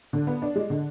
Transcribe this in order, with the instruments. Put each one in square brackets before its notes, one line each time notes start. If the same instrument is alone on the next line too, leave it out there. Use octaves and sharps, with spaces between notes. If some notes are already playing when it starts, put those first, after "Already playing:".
[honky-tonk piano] D3
B3
D4
G#3
D3